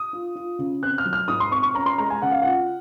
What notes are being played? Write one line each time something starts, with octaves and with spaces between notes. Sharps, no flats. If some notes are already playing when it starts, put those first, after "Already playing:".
Already playing: D#6
F4
F4
C#3
C4 F#6
F6
F#3
F6
G#2 D#6
C6
C4 C#6
C#6
C#4 A#5
C6
G#3 A#5
G#5
C#3 F#5
F5
F4 F#5